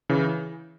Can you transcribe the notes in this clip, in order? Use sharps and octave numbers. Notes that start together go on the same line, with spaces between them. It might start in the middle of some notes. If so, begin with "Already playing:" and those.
C#3 E3